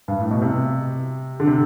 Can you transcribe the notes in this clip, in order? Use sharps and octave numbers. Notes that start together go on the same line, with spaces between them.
G2
A2
B2
C3
D3
C3